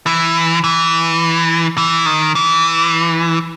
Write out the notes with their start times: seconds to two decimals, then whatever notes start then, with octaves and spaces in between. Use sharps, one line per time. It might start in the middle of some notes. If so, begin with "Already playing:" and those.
0.06 E3
0.64 E3
1.78 E3
2.06 D#3
2.35 E3